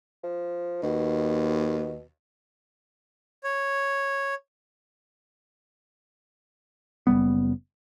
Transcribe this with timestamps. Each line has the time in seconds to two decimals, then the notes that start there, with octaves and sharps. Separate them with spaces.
0.24 F3
0.83 D#2 B2
3.44 C#5
7.07 F#1 F#2 G3 B3